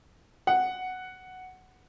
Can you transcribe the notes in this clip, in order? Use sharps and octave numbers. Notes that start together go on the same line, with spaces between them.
F#5